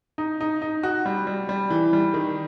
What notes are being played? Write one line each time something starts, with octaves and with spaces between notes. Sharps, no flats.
D#4
D#4
D#4
F#4
G3
G3
G3
E3
G3
D#3